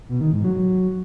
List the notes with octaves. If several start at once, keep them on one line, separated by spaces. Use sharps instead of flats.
B2
D#3
G#2
F#3